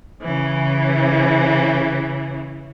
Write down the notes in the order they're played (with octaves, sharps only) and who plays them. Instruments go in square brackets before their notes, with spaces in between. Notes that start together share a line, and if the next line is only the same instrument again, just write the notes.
[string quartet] C#3 E3